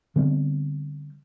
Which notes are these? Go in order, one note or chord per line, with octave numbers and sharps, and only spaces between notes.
D3 G3 B3 C4